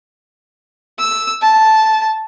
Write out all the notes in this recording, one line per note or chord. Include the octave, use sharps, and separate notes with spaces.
E6
A5